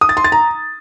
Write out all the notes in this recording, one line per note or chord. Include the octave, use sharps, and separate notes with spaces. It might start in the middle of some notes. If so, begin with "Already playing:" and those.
D#6
A6
C6
A6
A#5